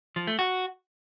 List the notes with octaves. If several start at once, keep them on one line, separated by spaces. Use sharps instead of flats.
F3
A3
F#4